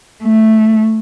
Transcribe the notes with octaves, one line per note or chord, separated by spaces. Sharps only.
A3